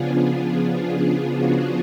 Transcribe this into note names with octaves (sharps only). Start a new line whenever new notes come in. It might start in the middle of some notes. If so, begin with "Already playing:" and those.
Already playing: C#3 F3 B3 D4 F4 G#4
F#4